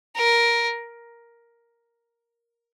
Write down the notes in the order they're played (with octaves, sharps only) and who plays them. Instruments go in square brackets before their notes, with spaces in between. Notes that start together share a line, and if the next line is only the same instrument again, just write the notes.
[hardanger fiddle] A#4